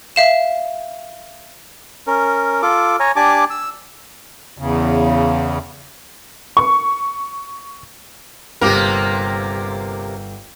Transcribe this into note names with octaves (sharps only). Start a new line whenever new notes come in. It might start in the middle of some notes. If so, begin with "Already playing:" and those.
E5 F5 E7
C#4 A#4
F4 A4 D6
C#5 G#5 A#5
D4 G4 G#5 A5 D6
E6
E2 C#3
C#6
G1 C3 A#3 G4 A#4 D6